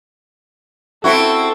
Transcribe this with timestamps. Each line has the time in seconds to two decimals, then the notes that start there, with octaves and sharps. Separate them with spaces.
1.04 C4 E4 F#4 A4